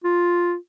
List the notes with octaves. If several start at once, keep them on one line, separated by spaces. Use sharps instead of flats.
F4